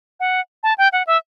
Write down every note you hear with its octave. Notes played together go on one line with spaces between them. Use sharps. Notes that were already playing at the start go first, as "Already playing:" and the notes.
F#5
A5
G5
F#5
E5